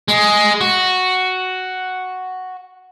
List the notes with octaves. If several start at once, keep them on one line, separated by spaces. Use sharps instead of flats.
G#3
F#4